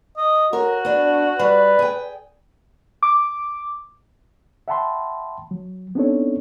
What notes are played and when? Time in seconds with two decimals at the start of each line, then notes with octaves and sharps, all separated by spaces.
0.17 D#5
0.53 F#4 A#4 C#5
0.85 B3 D4
1.39 G3 B4
1.79 G#4 G5
3.03 D6
4.68 E5 F#5 G5 A5 B5 C6
5.51 F#3
5.95 B3 C4 D4 D#4 A4 C#5